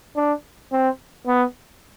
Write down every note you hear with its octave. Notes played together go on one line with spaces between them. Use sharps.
D4
C4
B3